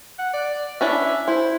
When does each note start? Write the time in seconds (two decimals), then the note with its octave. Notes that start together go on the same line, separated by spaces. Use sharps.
0.19 F#5
0.34 D5
0.81 C#4 D4 E4 E5
1.28 E4 C5